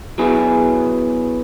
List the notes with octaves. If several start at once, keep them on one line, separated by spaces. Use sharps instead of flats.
F#3 B3 E4 G#4